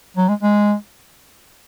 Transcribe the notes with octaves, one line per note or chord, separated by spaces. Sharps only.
F#3
G#3
G#3